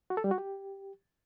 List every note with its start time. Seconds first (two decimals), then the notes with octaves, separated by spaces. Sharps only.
0.10 F#4
0.17 A4
0.24 G3
0.31 F#4
0.38 G4